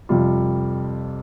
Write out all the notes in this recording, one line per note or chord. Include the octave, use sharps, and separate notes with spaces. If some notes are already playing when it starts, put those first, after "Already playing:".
F2 C3 G3 F4